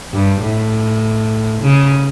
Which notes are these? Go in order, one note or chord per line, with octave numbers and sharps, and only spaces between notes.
G2
A2
C#3